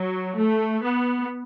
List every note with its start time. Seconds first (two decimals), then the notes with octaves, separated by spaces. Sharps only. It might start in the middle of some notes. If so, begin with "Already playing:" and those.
Already playing: F#3
0.37 A3
0.82 B3